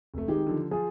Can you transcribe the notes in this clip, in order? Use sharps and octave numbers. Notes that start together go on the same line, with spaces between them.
F1 A3
D#3 G#3 G4
D3 F3
F3 F4 G#4